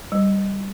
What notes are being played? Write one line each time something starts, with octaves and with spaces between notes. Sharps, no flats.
G3